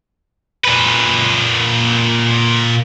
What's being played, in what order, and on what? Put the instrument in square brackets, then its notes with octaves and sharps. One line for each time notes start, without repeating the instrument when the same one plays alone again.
[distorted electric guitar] A#2 B4